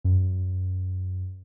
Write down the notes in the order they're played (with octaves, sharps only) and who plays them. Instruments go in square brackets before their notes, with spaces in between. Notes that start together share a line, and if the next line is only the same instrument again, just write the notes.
[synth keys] F#2